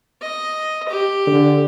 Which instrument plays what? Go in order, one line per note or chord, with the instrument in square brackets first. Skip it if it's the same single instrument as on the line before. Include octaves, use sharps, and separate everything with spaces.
[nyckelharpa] D#5
G4
[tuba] D3